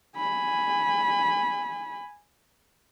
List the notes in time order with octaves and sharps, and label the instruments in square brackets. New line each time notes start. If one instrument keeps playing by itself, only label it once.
[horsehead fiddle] G#5 B5